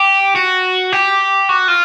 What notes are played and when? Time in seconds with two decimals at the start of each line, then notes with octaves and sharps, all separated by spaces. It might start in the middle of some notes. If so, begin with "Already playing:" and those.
Already playing: G4
0.36 F#4
0.93 G4
1.49 F#4
1.68 F4